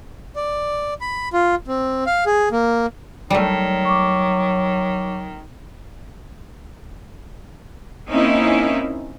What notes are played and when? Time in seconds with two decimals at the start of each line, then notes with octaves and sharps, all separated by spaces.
0.36 D5
1.01 B5
1.33 F4
1.68 C4
2.06 F5
2.26 G#4
2.52 A#3
3.30 D#3 F#3 G3 A3
3.85 C#6 D6
8.09 A#3 C4 C#4 D#4 E4